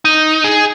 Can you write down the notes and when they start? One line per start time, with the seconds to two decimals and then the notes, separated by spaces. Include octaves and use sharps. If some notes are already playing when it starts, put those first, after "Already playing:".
0.05 D#4
0.44 G#4